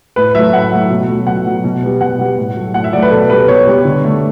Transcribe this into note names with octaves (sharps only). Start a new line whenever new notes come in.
A2 B4
F#3 A3 E5
A2 F#5
F#3 A3
B2
F#3 A3
B2 F#5
F#3 A3
B2
G3 B3
B2 F#5
G3 B3
A2
F#3 A3
A2 F#5
E5
F#3 A3 D5
B4
B2 A4
G3 B3 B4
B2 C#5
G3 B3
D3
A3